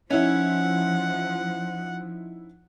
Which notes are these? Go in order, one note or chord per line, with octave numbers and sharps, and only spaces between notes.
F3 C#4 D#4 E4 F#5